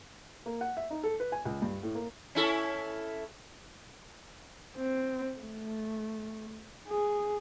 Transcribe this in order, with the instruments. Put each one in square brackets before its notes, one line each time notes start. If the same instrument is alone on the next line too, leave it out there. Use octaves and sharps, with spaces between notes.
[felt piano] A#3
F#5
E5
D#4
A4
B4
G#5
C#2
G2
A2
A#3
[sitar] C#4 E4 A4
[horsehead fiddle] C4
A3
G#4